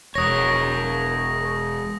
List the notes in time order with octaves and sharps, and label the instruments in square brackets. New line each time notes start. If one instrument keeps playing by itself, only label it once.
[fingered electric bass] E1 [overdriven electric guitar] A#4 C#5 [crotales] D#6 A#6